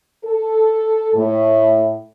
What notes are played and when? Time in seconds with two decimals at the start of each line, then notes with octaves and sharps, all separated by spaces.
0.25 A4
1.14 A2